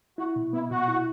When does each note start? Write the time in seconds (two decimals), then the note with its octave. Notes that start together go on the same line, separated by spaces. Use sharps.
0.18 E4 F#4
0.36 B2
0.53 B3 E4
0.71 B2 F#4
0.88 E4